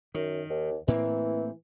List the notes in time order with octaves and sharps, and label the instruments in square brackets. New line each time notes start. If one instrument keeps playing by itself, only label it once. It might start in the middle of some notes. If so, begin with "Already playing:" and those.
[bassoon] F#2 [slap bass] D#3
[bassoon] D#2
[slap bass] A2 A#3 C4 [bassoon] E3